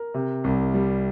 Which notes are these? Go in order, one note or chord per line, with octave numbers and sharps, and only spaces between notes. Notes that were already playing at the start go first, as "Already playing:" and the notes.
Already playing: A#4
C3
C2
G3